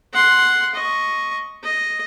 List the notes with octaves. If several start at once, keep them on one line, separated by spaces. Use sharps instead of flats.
F#5 C6
D#5 C#6
D#5